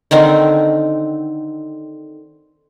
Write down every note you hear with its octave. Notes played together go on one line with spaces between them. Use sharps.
D3 D#3 C4 D#4